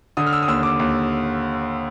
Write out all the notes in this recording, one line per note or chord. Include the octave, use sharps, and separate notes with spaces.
D3 D#6
F6
E6
D#6
D#2 E6
D6
D#2